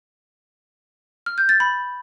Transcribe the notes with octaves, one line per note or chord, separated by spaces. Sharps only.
F6
G6
A6
B5